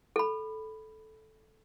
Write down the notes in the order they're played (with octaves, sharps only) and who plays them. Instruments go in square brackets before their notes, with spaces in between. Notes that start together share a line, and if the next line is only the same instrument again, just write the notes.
[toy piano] A4 B5